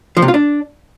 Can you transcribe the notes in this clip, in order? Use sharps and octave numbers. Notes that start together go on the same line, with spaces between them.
F3
C3
F4
D4